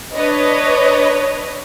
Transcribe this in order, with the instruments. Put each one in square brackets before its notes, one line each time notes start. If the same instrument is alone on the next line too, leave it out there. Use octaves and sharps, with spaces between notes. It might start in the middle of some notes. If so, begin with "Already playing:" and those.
[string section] D4 B4 C#5 D#5